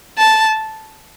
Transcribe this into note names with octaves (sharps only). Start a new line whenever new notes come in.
A5